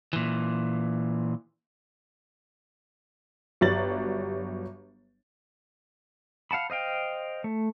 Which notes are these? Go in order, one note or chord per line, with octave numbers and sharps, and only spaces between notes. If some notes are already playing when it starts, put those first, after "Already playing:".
A#2 E3
G1 F#3 G3 A6 F#7
F5 F#5 A5 B5
C5 D#5 F5 G5
A3